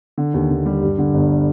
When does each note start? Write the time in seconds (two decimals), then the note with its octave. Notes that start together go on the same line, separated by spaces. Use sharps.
0.18 D3
0.34 D#2
0.50 D#2
0.66 G3
0.83 G2
0.98 D3
1.14 G1